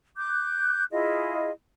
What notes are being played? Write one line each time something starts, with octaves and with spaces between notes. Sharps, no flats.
D6 F#6 G6
E4 F4 G#4 D#5